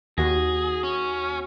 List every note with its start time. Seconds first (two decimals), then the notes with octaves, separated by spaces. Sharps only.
0.18 D#2 F#4 G#4 A#6
0.83 C#4